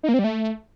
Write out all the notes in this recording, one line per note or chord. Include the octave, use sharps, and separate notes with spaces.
D#4
A#3
C4
G3
A3